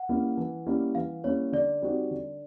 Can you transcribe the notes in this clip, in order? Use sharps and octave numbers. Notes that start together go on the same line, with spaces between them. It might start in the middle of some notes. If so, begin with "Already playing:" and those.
Already playing: F#5
G3 A#3 C#4 E4
E3
G3 A#3 C#4 E4
E3 F5
G3 A#3 C#4 E4 C#5
D3 D5
G3 C4 D#4 F#4
D3